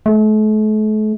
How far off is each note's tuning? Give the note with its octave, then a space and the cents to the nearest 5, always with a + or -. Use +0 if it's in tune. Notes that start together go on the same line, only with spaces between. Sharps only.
A3 -40